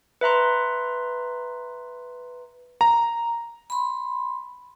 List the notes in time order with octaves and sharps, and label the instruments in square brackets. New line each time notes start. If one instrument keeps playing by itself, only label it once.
[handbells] B4 E5 A#5 C6
[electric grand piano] A#5
[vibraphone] B5 C6